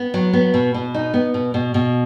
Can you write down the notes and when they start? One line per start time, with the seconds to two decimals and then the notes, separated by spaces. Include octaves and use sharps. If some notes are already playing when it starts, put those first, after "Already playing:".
Already playing: B3
0.14 F#3
0.33 B3
0.54 B2
0.74 B2
0.94 D#4
1.14 B3
1.34 B2
1.54 B2
1.74 B2